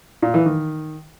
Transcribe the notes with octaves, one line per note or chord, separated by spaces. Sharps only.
A#2
E3
D#3